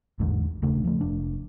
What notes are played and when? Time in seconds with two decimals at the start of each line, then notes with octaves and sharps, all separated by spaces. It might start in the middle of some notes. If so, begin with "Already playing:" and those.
0.20 A1 E2 G#2 D3
0.62 D#1 C#3 A3 D4
0.84 F3 A3
1.01 F1 D4